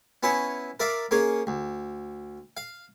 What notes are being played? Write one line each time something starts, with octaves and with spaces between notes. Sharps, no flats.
B3 C#4 E4 C#5 E5
A#4 D5 E5 F5
A#3 C#4 G#4 C#5
D2
F5